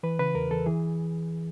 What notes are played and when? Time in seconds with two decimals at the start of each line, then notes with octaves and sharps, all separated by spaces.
0.03 E3 B4
0.19 C#3 B4
0.35 E2 A#4
0.51 E2 A4
0.66 E3 G#4